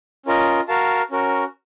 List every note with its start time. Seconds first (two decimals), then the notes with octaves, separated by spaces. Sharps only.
0.26 C#4 F4 A#4 D#5
0.68 F#4 A#4 F5 A5
1.11 C#4 F#4 A#4